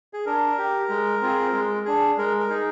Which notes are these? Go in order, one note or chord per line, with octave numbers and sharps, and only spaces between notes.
G#4
D4 A#4
G4
G#3
C4 F4 G#4
G#3
D4 G#4
G#3 A#4
A#4
D#4 G#4